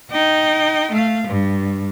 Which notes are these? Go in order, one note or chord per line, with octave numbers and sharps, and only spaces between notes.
D#4 G5
A3 F5
G2